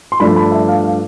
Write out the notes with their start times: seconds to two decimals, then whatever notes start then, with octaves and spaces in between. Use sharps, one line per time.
0.12 C6
0.20 G2 F3 A3 D4 B5
0.36 B5
0.52 E5
0.68 F5
0.84 F5